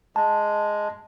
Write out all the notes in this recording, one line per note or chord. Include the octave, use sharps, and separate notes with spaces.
G#3 A5